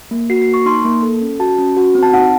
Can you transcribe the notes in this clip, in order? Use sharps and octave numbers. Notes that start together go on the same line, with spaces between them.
A#3
F#4 C7
C7
A#3
C#6
D#4 C6
A#3
A4
C#4
F#4 A5
C#4
F#4
C4
A5
D#4 F#5